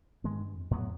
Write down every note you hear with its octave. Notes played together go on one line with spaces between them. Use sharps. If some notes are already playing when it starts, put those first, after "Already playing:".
G#2 D#3 G#3 B3
G2
F2
F2 A2 F#3 B3